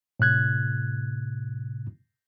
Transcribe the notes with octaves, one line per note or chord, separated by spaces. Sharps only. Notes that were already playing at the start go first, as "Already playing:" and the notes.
A2 C3 F#6 G#6